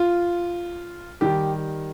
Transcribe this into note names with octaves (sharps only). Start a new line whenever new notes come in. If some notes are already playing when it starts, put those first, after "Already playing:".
Already playing: F4
D#3 G3 G4